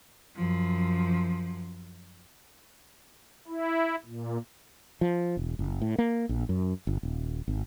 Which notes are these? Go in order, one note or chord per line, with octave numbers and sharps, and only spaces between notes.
F#2 F3
E4
A#2
F3
E1
F#1
A2
A#3
A#1
F#2
G1
D#1
G#1